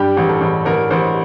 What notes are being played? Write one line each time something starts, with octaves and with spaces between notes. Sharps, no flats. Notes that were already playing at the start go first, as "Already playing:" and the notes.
Already playing: G2 G4
A1
A4
A1
A1 A#4
A1 C5